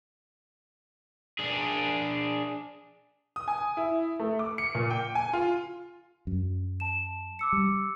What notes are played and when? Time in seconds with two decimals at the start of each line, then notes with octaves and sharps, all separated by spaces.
1.39 D4 G#4
3.36 D#6
3.48 G#5
3.77 E4
4.20 A3
4.39 D6
4.58 C#7
4.75 A#2
4.90 G5
5.15 G#5
5.33 F4
6.27 F#2
6.80 A5 E7
7.39 D6 E6 C#7
7.52 G3